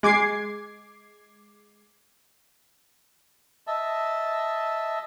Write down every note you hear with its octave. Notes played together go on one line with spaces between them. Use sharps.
G#3 D6 G#6 C7
D#5 E5 A5